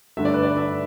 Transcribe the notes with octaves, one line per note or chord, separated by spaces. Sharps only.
G2 D3 A3 E5
D5
B4
D5
E5